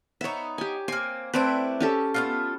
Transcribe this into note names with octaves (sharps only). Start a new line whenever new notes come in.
B3 D#4 C#5 E5
G4 G#5
A#3 C4 G#5
A3 C4 D4 E4 B4
C#4 G4 A4
A3 B3 F4